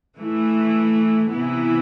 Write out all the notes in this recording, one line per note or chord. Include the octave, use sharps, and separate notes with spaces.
E3 A3 E4
C3 E3 B3 E4